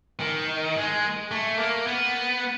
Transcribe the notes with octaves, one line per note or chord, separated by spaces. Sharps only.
D#3
G#3
A3
A#3
B3